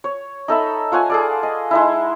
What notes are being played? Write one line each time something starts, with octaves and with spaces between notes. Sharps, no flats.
C#5
D#4 A4 E5 B5
F4 C#5 F#5 G#5
G#4 A4 D5
D#5
G#3 D#4 E4